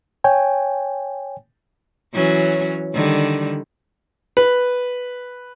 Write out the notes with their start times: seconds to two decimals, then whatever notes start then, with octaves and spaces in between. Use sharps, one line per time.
0.24 C#5 G5 G#5
2.14 E3 F#3 C#4
2.94 D3 D#3 G3
4.37 B4